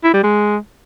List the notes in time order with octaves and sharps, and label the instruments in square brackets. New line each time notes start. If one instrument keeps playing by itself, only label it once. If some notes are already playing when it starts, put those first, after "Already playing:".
[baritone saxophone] E4
G3
G#3